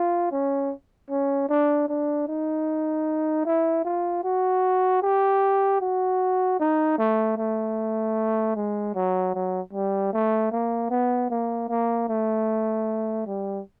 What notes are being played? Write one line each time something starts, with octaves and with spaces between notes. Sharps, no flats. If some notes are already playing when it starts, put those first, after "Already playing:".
Already playing: F4
C#4
C#4
D4
D4
D#4
E4
F4
F#4
G4
F#4
D#4
A3
A3
G#3
F#3
F#3
G3
A3
A#3
B3
A#3
A#3
A3
G3